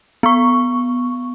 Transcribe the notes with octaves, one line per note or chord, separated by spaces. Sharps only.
B3 C#6